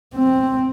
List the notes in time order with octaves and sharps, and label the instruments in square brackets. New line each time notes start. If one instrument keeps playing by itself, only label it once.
[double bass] C4